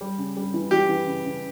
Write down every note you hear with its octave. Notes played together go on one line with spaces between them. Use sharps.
G3
C#3
G3
E3
E3 G4
E3
C#3
C#3